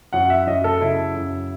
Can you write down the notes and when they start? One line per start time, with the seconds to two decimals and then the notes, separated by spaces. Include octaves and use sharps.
0.13 F#2 F#5
0.30 E5
0.47 F#2 D#5
0.64 A4
0.81 C#3 E4
1.16 F#2